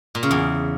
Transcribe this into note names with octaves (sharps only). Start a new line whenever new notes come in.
A#2
C#3
E2